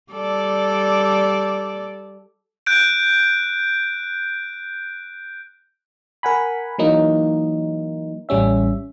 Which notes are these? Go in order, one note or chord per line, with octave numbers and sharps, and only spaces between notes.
G3 A4 D5
F#6 G6 D7
A#4 F#5 G#5 B5
E3 F#3 A#3 D#4
A1 G3 C#4 E5